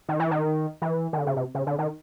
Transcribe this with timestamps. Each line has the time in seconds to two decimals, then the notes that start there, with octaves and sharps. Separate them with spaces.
0.09 D#3
0.20 E3
0.31 D#3
0.82 E3
1.13 D#3
1.18 D3
1.27 C#3
1.36 C3
1.55 C#3
1.67 D3
1.79 D#3